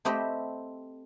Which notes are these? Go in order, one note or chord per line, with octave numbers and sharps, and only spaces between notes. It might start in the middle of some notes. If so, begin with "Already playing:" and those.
A3 C4 G4 D#5 B5